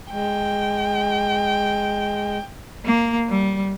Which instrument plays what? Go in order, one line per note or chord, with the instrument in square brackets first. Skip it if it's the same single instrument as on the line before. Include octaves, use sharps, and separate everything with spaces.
[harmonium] G#3 [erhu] G5
[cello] A#3
G3